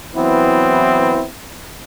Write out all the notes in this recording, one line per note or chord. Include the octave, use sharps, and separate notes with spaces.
E3 F#3 B3 C4 E4